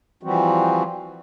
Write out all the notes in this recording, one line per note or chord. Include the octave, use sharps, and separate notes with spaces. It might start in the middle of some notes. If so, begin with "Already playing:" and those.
E3 F3 G3 C4 F#4